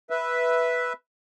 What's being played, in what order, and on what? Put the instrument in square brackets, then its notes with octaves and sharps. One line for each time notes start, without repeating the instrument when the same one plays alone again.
[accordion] B4 E5